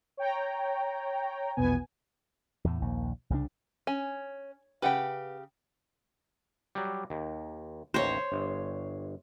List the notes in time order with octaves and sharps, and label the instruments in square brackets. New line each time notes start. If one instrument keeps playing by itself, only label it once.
[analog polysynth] C#5 G5 A#5
A#1 E2 B2 B3 G#5
[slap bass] E2 A2
A#1 D#2
C2 C#3 G#3 D4
[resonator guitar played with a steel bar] C#4 [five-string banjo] G#5
[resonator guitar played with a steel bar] C#3 G4 [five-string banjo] B4 F#5 G5
[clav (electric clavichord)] F#3 G3
D#2
[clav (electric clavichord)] A1 D#2 A#5 [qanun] C5 C#5
[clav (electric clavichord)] G1